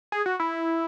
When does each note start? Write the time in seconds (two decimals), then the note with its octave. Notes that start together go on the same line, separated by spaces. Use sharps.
0.12 G#4
0.26 F#4
0.40 E4